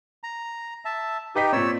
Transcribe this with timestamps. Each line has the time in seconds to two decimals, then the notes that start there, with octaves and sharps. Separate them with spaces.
0.23 A#5
0.85 E5 A5
1.35 D#4 G4 B4 D#5 B6
1.53 A#2 C4 C#5 D5 E6